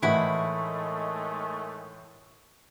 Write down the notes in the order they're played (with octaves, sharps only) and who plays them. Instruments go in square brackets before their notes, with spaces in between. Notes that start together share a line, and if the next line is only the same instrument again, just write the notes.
[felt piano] A2 E3 [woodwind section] D#3 G#3 A3 [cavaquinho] E4 F#5 B5